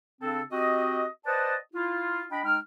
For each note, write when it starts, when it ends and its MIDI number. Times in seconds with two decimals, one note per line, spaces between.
0.22 0.41 49
0.22 0.41 60
0.22 0.41 62
0.22 0.41 69
0.52 1.05 60
0.52 1.05 66
0.52 1.05 67
0.52 1.05 75
1.26 1.56 71
1.26 1.56 72
1.26 1.56 74
1.26 1.56 75
1.26 1.56 78
1.26 1.56 81
1.74 2.25 64
1.74 2.25 65
2.31 2.41 62
2.31 2.41 75
2.31 2.41 79
2.31 2.41 83
2.45 2.57 56
2.45 2.57 63
2.45 2.57 79
2.45 2.57 89